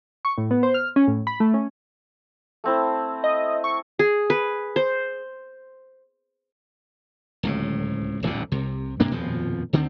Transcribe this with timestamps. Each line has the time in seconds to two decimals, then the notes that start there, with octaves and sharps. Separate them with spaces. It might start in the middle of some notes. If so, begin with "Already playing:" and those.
0.25 C#6
0.38 A2
0.51 B3
0.63 C5
0.74 F6
0.96 C#4
1.08 A2
1.27 B5
1.40 A3
1.54 C#4
2.64 A3 C4 E4
3.24 D#5
3.64 C#6
3.99 G#4
4.30 B4
4.76 C5
7.43 D1 C#2 A2
8.23 D#1 A1 F2 D3
8.52 C2 C3
9.00 G2 C3 A#3 D4
9.11 D#1 F2 B2 F3
9.73 D2 D3 D#3 C4